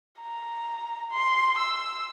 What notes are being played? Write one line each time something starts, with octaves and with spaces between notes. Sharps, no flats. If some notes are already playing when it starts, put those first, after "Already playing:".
A#5
C6
E6